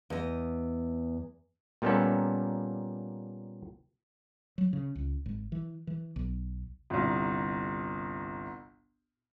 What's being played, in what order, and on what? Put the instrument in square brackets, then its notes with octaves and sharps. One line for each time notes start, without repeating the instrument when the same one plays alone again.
[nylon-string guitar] E2 D#5
[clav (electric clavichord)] A#2 G3 A#3 B3 C#4 A4
[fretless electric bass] F#3
C#3
C#2
G#1
E3
E3
B1
[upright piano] G1 C2